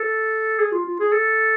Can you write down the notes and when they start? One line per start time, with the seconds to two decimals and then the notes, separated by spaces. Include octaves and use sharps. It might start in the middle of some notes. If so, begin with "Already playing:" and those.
Already playing: A4
0.59 G#4
0.72 F4
0.86 F4
1.00 G#4
1.12 A4